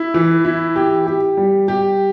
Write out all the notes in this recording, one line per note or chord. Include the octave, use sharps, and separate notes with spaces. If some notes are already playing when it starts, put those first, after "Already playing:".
Already playing: E4
E3
E4
G4
G4
G3
G4